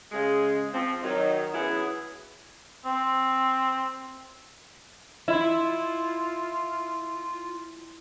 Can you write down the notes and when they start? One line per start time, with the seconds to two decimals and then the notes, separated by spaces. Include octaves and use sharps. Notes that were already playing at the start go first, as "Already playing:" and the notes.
0.12 C#3 G#3
0.74 F3 C4
1.03 D#3 F#3 D#4
1.54 E3 F#3 B3 C#4 E4 G#4
2.85 C4
5.28 E4 F4